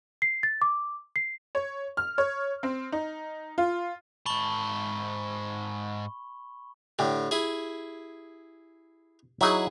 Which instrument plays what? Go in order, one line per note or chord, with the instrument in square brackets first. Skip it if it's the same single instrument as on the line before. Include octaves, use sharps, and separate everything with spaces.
[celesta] C7
A6
D6
C7
[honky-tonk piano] C#5
F6
C#5
C4
D#4
F4
[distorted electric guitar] G#2 A5 [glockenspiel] B5 C#6 G7
[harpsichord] A2 D3 [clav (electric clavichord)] G4
[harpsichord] E4 G#4
[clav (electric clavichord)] F#3 D#4 [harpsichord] E4 G#4 F#5